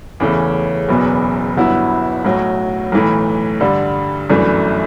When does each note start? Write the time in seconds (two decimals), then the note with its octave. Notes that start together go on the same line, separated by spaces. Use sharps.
0.20 E2 C#3 E3 A3 C#4
0.88 F#1 E2 B2 F#3 B3
1.57 G1 G2 F#3 B3 E4
2.25 B1 A2 F#3
2.92 B1 A2 E3 A3
3.60 G2 D3 G3
4.29 G1 F#2 E3 A3 D4